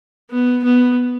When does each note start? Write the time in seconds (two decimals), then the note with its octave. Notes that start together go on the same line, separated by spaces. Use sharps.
0.30 B3
0.64 B3